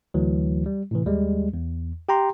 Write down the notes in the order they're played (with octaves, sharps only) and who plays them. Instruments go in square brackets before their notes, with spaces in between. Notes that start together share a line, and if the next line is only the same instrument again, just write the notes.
[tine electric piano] D2 E3 F#3
G3
A2 C3 E3
D#2 G3 G#3
E2
G4 G5 A#5 C6